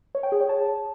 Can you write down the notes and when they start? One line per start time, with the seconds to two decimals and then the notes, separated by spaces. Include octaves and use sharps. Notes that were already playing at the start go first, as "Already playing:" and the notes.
0.15 C#5
0.23 G5
0.32 G#4
0.41 C#5
0.49 A5